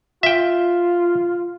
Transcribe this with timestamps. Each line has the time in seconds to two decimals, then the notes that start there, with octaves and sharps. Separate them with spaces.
0.23 F4 E5 G5